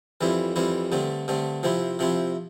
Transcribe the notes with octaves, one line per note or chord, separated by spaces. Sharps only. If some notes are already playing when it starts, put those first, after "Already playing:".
F2 E3 G3 C4 E4
F2 E3 G3 C4 E4
G2 D3 A3 C4
G2 D3 A3 C4
C3 F3 C4 E4
C3 F3 C4 E4